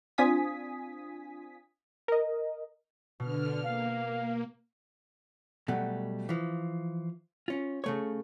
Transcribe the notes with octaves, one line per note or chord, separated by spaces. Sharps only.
C4 D4 F4 G#5 D#6 B6
A#4 D#5
B2 D3 F6
A#3 F5
B2 F#3 G3 A3
E3 F3
C#4 F4
C#3 A3 C#5